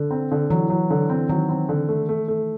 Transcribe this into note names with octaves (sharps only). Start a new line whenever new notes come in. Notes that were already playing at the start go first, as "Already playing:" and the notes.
Already playing: D3
C4
D3
E3 F#3
F#3
D3
C4
D#3 F#3
C4
D3
A3
A3
A3